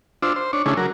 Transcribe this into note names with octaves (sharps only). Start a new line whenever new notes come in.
D4 F4 C5 E6
C5
D4 C#5
C#3 A3 C#4 D4 E4 G#4
F#3 A#4